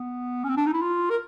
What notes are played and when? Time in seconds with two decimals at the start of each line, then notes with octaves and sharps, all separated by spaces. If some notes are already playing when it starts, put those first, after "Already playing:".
Already playing: B3
0.44 C#4
0.49 C4
0.57 D4
0.66 D#4
0.74 E4
0.82 F4
1.10 A#4